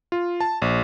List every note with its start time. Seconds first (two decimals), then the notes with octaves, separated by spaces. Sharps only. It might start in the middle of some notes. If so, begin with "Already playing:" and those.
0.12 F4
0.40 A5
0.62 A#1